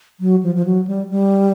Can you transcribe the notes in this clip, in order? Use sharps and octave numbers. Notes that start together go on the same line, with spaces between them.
F#3
F3
F3
F#3
G3
G3